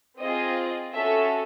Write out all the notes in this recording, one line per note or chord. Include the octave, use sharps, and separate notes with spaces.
C4 F4 G#4 D#5
C#4 F#4 A4 E5